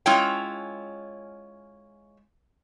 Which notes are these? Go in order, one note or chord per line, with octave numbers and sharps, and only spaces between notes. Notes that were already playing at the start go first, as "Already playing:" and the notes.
G#3 C#4 E4 F4 C#5 G5